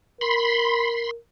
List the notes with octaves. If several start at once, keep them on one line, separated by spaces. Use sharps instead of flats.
A#4 B5 C6